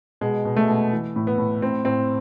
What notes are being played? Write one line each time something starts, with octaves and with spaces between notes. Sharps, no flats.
B2 G#3
B2
A3
B2
E3
A2
B3
A2
A2 C4
A2 C4